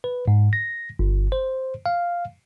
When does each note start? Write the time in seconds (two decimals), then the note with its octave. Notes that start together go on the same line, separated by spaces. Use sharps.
0.04 B4
0.28 G#2
0.53 A#6
0.99 G1
1.32 C5
1.86 F5